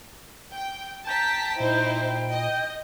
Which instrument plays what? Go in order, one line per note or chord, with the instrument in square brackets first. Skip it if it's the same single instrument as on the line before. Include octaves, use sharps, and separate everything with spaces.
[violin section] G5
[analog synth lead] G5 [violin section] A5 A#5 B6
[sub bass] A#2 [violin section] D#4 E4 C5
[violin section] D#5